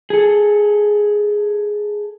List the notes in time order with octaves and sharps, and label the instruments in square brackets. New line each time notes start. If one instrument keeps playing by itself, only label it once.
[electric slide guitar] G#4 A4